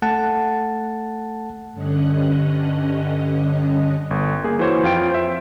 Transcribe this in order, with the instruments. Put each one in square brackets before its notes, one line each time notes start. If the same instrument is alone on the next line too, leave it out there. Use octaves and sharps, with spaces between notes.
[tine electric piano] A3 F#5 A5
[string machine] G2 D3 C#4 D#5 F#6
[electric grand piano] G1
A#3 G#4
E3 F#4 C5 C#5
F2 F4 G5 D7
C5 E5